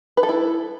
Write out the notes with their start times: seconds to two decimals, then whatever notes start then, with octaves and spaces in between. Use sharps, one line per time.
0.17 B4
0.23 A4
0.29 E4